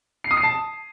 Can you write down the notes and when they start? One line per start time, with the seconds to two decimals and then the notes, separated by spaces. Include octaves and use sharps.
0.24 C7
0.31 D#6
0.37 C7
0.43 A5